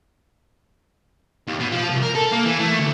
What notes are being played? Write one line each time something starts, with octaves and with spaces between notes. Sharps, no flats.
D#2
B2
F3
C2
A#4
A4
A#3
E3
A3
D2